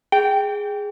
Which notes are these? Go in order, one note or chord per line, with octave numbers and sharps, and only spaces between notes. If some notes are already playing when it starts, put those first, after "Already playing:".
G#4 G5